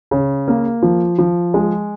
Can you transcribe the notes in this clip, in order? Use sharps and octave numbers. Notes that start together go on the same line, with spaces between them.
C#3
A#3
F3
F3
G#3